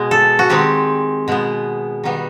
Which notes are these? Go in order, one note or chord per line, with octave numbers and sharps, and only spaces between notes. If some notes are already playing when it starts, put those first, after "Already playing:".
Already playing: B2 G#3 B3
A4
F#4
D#3 G#3 C4 G4
B2 G#3 B3
D#3 G3 B3